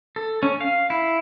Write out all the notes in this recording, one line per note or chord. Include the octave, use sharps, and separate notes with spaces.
A4
C#4
F5
E4